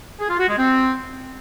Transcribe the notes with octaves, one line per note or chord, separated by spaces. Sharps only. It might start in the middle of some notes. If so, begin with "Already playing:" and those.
G#4
F4
F#4
G#3
C4